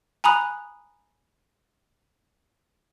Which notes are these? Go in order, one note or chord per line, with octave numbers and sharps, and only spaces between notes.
G#5 A#5 B5 D#6 F#6